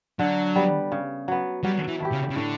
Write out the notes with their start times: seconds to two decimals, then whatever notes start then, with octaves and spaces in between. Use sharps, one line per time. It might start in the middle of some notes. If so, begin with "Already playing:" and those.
0.19 D3 F#3
0.56 G3 B3
0.92 C#3
1.28 F#3 B3
1.64 F#3 G3
1.88 E3
2.00 A3 E4 G4
2.12 C#3
2.30 C#3
2.36 A2 D3